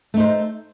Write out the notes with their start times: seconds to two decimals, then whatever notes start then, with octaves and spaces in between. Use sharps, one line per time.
0.14 A3
0.17 D#4
0.20 C5